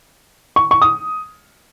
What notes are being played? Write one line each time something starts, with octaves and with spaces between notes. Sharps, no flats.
C#6
C#6
D#6